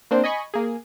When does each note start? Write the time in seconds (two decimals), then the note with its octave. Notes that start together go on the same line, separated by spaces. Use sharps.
0.11 A#3 C4 D4 C5
0.24 D#5 G#5 B5 C#6
0.54 A#3 G#4